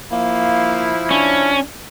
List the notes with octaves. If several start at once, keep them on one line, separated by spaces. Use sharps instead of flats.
F3 A#3 E4
C#4 D4